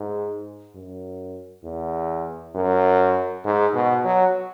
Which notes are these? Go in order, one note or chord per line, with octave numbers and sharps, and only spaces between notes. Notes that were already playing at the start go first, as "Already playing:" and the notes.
Already playing: G#2
F#2
E2
F#2
G#2
B2
F#3